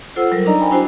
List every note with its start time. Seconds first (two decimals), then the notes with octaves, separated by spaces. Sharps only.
0.16 F4 A4 C5 F#5 E6
0.32 F#3 G3 A#4
0.46 D4 D#4 D5 D#5 A#5
0.60 G5 G#5 B5
0.71 D4 E4 F#4 C5